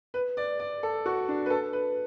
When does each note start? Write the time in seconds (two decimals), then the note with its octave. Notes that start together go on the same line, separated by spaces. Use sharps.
0.14 B4
0.37 D5
0.60 D5
0.83 A4
1.06 F#4
1.29 D4
1.46 B4
1.50 A4
1.73 B4